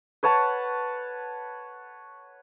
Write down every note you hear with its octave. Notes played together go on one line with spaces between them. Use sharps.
B4 C#5 F#5 A5